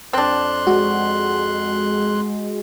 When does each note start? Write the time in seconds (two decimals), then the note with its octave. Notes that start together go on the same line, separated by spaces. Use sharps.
0.13 F2 C4 D4 C6 F#6
0.67 G#3 F#4